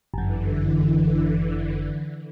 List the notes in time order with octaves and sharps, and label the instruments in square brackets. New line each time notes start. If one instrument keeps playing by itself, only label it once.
[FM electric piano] G1 F#2 [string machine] D3 E3